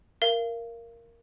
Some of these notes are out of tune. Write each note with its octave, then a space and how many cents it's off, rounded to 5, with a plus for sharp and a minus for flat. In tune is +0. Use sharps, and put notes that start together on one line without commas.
A#4 +0 F5 -30